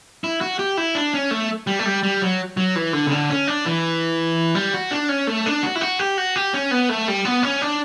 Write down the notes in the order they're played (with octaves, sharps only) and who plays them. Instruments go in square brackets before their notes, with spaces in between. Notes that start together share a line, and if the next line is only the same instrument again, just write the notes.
[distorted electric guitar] E4
F#4
G4
E4
D4
C#4
A3
G3
A3
G3
G3
F#3
F#3
E3
D3
C#3
D3
C#4
D4
E3
G3
F#4
D4
C#4
A3
D4
F#4
E4
F#4
G4
F#4
G4
C#4
B3
A3
G3
B3
C#4
D4